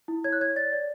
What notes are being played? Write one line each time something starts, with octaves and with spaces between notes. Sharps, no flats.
E4
C#5 G#6
F#6
C#5 G#6
D5 A6
D5